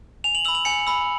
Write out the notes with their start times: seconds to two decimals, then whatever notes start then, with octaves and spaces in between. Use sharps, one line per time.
0.24 G#5 F7
0.35 F#7
0.45 B5 E6 F#7
0.55 F#7
0.65 G#5 C#7
0.87 B5 E6